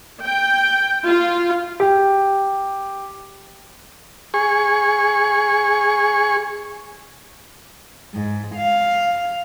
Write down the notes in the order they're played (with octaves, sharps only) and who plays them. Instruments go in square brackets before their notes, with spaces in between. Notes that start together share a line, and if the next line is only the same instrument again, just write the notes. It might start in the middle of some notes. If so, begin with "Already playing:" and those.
[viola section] G5
F4
[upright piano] G4
[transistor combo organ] G#4 C#6
[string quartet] G#2
F5